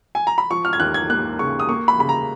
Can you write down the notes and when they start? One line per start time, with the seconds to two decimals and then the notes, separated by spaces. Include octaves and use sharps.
0.15 G#5
0.27 A#5
0.38 B5
0.51 F3 C#6
0.65 F6
0.73 G#6
0.80 D#2 F#6
0.94 G#6
1.10 A#3 F#6
1.39 C#3 C#6
1.60 D#6
1.69 A#3 C#6
1.88 B5
1.99 C#3 B5
2.09 A#5